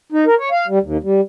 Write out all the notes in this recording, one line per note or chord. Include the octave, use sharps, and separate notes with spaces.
D#4
A#4
C#5
F5
G3
D#2
G3